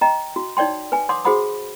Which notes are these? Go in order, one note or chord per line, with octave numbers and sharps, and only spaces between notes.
D#5 G5 A#5
F#4
D#4 C#5 D5 G5 C6
B4 G#5
C#5 F#5 C6 D6 D#6
F#4 G#4 C5 F#5 B5 D#6